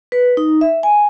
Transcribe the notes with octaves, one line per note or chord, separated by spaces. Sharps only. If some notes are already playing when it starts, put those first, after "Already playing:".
B4
D#4
E5
G#5